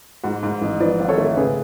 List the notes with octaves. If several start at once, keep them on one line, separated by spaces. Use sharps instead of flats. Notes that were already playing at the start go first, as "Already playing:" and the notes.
G#2 F#4
G#2
A1
F3 B4 D5
G#1
A4 C#5
A3
C#3 G#4 B4